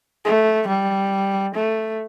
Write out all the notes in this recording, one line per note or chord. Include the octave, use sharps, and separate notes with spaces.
A3
G3
A3